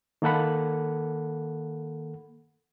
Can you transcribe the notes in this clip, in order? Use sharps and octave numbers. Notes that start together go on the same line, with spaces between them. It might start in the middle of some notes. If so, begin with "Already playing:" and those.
D#3 A#3 A4 F#5 B5